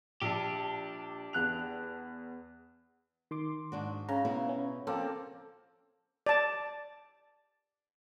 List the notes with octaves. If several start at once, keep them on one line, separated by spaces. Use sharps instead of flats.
A#1 D4 G4
E2 F#6 F7
D#3 C6 D6
G#2 D4 F#4
C#3 A#5
B2 B3 E4
C#4
F3 A#3 C4 A4
D5 A5